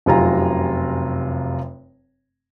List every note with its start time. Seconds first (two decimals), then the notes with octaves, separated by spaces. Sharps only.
0.06 F1 F#2 C3 F4 G#5 A#5